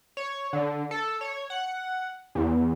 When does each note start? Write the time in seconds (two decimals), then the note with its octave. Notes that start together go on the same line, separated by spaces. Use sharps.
0.17 C#5
0.53 D3
0.91 A4
1.21 C#5
1.50 F#5
2.35 E2